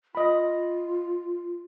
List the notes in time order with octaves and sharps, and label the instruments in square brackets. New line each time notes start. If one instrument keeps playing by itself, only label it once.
[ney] F4 [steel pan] D#5 B5